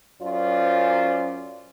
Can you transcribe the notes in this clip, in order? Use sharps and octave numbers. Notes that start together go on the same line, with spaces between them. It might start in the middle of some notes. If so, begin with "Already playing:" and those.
F#2 C#4 F4 C5 D5